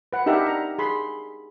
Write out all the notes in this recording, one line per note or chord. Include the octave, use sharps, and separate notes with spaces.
B4 F#5
D4 D#4 G4 A#4 E5 F#5
A#5
G#4 B5 C6